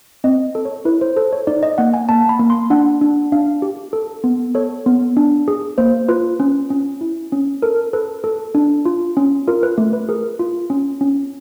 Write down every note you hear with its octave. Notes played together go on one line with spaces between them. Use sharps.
C4 D#5
A4
C#5
E4 B4
C5
A4 C5
C#5
D#4 D5
D#5
A#3 F#5
G#5
A#3 A5
B5
A#3
C6
D4 F#5
D4
D4 F5
G4
A4
B3
A4 C#5
B3
D4
G#4
A#3 C5
F4 B4
C#4
C#4
E4
C#4
A4 A#4
A4 B4
A4
D4
F4
C#4
F4 A#4
B4
A3
B4
G#4 A#4
F4
C#4
C#4